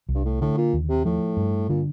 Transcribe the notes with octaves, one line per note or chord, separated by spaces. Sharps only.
C2
G2
A2
A2 D3
A#2
D#2
C3
A2 F3
G2
A#2 D3